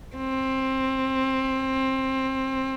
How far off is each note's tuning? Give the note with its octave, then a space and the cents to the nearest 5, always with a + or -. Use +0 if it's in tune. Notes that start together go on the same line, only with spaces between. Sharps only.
C4 +20